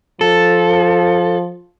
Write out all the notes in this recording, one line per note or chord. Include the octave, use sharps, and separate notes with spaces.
F3 A4